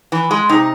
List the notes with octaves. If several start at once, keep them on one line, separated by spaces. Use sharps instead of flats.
E3
G#3
C3 D#4